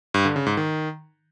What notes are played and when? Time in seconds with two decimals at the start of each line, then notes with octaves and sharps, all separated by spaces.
0.14 G2
0.25 D3
0.36 C#3
0.46 G#2
0.57 D#3